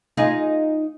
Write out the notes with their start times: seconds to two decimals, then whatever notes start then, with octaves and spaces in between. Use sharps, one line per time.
0.17 D#4 F4 G#4